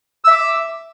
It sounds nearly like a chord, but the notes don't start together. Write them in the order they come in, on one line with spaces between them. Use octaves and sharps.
E6 E5 D6